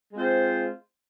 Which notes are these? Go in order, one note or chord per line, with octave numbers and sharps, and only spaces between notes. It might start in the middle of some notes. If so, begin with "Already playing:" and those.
G#3 C4 F4 C5